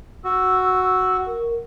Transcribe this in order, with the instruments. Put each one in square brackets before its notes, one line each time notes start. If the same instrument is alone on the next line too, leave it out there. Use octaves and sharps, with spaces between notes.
[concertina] F#4 [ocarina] E6
[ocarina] A#4